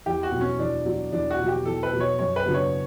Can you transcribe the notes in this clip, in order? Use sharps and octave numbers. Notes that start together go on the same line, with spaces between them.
E2 G4
F#4
B2 F#3
C#4
E2 D4
B2 F#3
E2 D4
F#4
B2 F#3
G4
E2 A4
B4
B2 F#3
C#5
F#2 C#5
B4
C#3 F#3 B3 D4
C#5